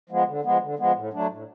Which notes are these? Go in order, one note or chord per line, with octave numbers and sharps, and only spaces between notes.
F3 G#3 B3
D3
F3 G#3 B3
D3
F3 G#3 B3
A2
F#3 A3 D4
A2